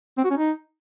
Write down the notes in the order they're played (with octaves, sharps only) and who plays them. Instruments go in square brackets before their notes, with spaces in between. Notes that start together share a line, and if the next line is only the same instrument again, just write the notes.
[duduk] C4
F#4
C#4
D#4